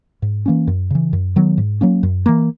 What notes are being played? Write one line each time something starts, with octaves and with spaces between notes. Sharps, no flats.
G#2
E3 A#3 C#4
F#2
C#3 E3
F#2
D#3 F#3 B3
G#2
F#3 A#3 C#4
F#2
E3 A#3